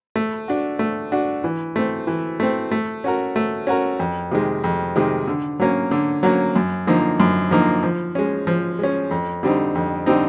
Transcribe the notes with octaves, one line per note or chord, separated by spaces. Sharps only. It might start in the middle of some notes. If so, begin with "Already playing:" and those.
A3
D4 F#4
A3
D4 F#4
E3
A3 C4
E3
A3 C4
A3
C#4 F#4 A#4
A3
C#4 F#4 A#4
F2
C3 D#3 G#3
F2
C3 D#3 G#3
D3
F#3 A#3 C#4
D3
F#3 A#3 C#4
F#2
D3 F3 A#3 D#4
F#2
D3 F3 A#3 D#4
F3
G#3 C#4
F3
G#3 C#4
F2
D3 G3 C4 D#4
F2
D3 G3 C4 D#4